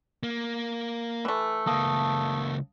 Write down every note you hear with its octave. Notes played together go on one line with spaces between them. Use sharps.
A#3
E3 A3
C#2 A#3 F5 A5 D#6